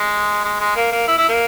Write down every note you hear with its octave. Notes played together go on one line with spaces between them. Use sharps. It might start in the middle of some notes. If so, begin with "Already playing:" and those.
Already playing: G#3
G#3
G#3
A#3
A#3
E4
E4
A#3